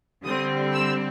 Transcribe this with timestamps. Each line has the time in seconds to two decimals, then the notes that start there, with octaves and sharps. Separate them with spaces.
0.24 D3 G3 C4 D#6
0.74 E6